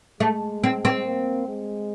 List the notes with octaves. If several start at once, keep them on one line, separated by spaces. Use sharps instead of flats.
G#3 A3
C4
C4
A#3
G#3